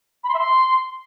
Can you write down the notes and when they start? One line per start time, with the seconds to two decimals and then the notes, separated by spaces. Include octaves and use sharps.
0.24 B5
0.29 C6
0.34 E5
0.39 C6